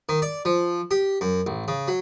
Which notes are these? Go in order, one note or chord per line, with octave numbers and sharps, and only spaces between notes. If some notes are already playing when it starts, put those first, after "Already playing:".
D#3
D5
F3
G4
F#2
A1
C#3
F#3